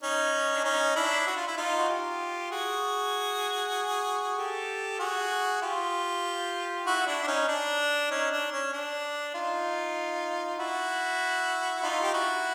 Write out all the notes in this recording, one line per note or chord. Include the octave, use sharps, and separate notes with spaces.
C#4 D#4
D4
C#4 D#4
D4 E4
F#4
F4
E4
D#4 F4
F#4
F4 G4
F#4 G#4
G4 A4
F#4 G#4
F4 G4
E4 F#4
D4 E4
D4
C#4 D#4
D4
C#4 D#4
D4
C#4
D4
D#4 F4
E4 F#4
D#4 F4
G4
E4 F#4